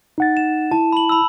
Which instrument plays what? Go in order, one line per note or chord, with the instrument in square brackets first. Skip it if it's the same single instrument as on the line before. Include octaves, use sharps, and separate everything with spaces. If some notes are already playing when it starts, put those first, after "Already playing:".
[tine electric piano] D#4 F#5 A6
[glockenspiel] E7
[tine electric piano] E4 [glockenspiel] A5
[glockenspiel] B5 F#7
B5 E6